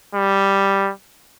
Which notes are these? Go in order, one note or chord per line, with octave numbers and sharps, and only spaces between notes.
G3